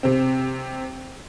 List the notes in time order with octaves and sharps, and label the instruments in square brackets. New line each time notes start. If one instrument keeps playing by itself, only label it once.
[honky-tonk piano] C3 C4